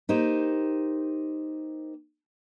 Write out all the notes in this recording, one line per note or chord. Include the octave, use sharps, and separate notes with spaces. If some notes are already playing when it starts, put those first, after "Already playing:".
A#3 D#4 G4 C5